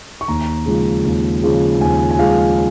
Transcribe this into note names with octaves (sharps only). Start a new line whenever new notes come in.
C#6
D#2 A#5
C#3 F3 G#3
D#2
C#3 F3 G#3
D#2 G#5
G#5
C#3 F3 G#3 F5